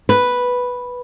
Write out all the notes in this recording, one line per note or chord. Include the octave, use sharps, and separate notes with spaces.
B4